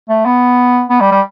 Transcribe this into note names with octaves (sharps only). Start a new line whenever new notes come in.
A3
B3
B3
G3
G3